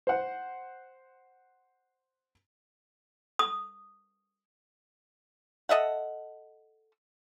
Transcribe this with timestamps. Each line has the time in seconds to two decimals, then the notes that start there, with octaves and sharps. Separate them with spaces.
0.07 C5 F#5
3.39 D#6
5.69 A4 D#5 E5 F#5